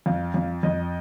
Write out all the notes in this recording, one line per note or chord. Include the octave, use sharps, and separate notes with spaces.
F2 F5
F2
F2 D#5